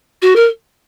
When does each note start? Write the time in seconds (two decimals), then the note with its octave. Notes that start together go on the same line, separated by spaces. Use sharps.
0.22 F#4
0.36 A#4